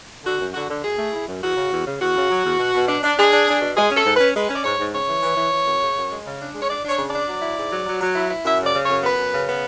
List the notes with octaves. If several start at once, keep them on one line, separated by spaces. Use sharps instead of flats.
D3 F#4
F#2
D3 F#4
D3
F#2 G#4
A3
E4
F#2
E2 F#4
C#3
E2
C#3
E2 F#4
C#3
F#3
E2
B2
B2
D4
D4
D4 G#4
D4
D4
B2
G#3 G#4
C#4
A4
G#2
C#4 B4
G#3 B4
C#4
D5
G#2 C#5
G#2
C#3 C#5
E3
E3
E3
E3
F#2
C#3
F#2
G#3
C#3
D4
G#3
C#5
D4 D5
D4
C#5
C#3
D5
D4
F#3
E4
G#2
F#3
F#3
F#3
E4
E4
F#2 E5
C#3 D5
C#3
F#2 C#5
B3 B4
F#2
C#3
B3